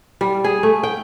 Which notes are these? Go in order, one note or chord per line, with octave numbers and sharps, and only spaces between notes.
G3
G#4
A3
G5